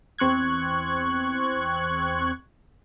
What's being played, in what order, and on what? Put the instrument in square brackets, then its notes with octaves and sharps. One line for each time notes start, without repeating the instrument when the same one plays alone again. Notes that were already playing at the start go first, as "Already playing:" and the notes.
[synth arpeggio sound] E2 C4 C#6 F#6 G#6